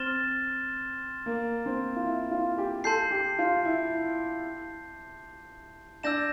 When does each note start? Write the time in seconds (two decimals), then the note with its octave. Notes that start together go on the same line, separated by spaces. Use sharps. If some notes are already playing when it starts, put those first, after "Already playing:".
Already playing: C4 F6 A6 E7 G7
1.26 A#3
1.66 C4
1.96 F4
2.06 E4
2.31 F4
2.58 G4
2.84 A4 A5 C6 G6 C7
3.11 G4
3.39 F4
3.65 E4
6.03 D4 E6 G6 A#6 E7